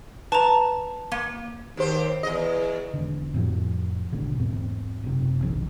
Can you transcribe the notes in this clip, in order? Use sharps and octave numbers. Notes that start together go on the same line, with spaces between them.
B4 A5 A#5
A#3
D#2 G4 C5
E2 D#5
E1 D3
F2 A2 F3
G#1 B2 D3
E2 G#2 C4
F#1 C3
D#1 A#1 D#3 F3